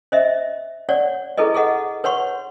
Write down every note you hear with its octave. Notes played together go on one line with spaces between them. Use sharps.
C5 D#5 E5
C#5 D5 F#5
E4 G#4 A4 B4 D#5
G#4 A4 D#5 F#5
B4 C#5 F#5 C6 C#6